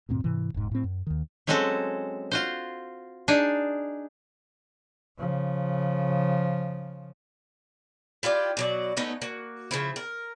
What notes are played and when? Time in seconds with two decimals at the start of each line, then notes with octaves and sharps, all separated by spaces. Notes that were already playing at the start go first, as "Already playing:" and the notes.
0.09 D2 G2 A#2 C4
0.24 G#2 C3 E3
0.54 E1 G#2
0.71 A2 C4
0.84 F#2
1.07 D#2 D#3
1.47 F#3 G#3 C4 C#4 F#4 A4
2.31 F4 F#4 C5
3.28 D4 D#4 G#4
5.18 C#3 F3
8.23 E4 F4 G4 D5
8.57 B2 F#3 D5
8.97 A3 B3 C#4 D#4
9.21 A#3 F#4
9.71 C#3 F3 E4
9.96 A#4